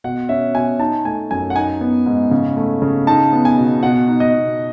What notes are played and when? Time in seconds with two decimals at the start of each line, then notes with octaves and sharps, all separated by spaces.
0.04 B2 F#5
0.29 C#4 E5
0.55 B2 G#5
0.79 D#4 A5
1.05 A3 G#5
1.31 F#2 G#5
1.50 F#5
1.56 D#4 G#5
1.81 B3
2.06 G#2
2.31 C#3
2.57 A3
2.82 C#3
3.07 D#4 A5
3.33 B3
3.45 G#5
3.58 B2
3.83 B2 F#5
4.08 D#4
4.20 D#5
4.33 B2